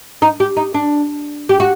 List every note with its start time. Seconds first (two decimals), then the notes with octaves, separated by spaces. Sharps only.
0.22 D#4
0.40 G4
0.57 D#4
0.74 D4
1.49 G4
1.60 F#4